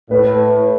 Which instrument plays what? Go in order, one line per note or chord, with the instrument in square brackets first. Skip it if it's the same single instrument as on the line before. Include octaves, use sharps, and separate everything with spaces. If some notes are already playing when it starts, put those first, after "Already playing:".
[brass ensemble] A2 [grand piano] B4